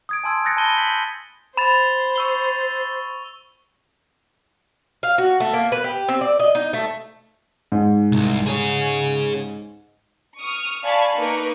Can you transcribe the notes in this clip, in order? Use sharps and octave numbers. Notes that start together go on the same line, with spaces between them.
D#6 G#6 D7
G#5 A5 C6 E6 G#6
D#6 F#6 G6 A6 A#6 C#7
A5 B5 D#7 G7
G6 B6 F#7
C5 B5 A6 F7
C#6 E6 G7
F5
F#4
A3
A#3
B4
G4
C4
D5
D#5
D#4
A3
G#2
C2
G#4 C#5
C#6 D#6 F6
D5 F5 G#5 A5 B5 C#6
A#3 D#4 A#4 B4 C#6